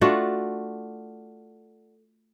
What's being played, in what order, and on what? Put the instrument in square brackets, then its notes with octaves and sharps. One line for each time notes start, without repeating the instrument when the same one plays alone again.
[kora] A3 D4 F4 F#4